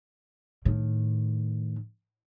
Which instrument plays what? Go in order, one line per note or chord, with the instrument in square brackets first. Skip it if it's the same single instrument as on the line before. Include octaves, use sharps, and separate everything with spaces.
[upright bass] A2 D#3